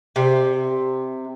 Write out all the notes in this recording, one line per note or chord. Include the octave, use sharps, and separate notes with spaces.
C3